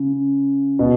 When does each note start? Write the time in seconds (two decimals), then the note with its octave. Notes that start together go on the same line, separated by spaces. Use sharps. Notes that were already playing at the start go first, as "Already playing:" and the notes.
Already playing: C#3
0.79 B2